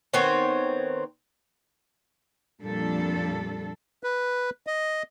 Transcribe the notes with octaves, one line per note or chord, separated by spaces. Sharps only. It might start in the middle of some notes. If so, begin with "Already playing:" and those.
D#3 B3 C4 C#5
F2 A#2 G3 D4 A4
B4
D#5